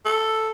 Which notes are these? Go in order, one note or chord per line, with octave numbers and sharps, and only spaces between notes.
A4